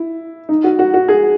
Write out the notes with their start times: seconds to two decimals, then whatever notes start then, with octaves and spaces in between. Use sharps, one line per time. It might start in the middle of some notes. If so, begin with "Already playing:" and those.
Already playing: E4
0.49 D#4
0.64 F#4
0.79 F#4
0.94 F#4
1.08 G#4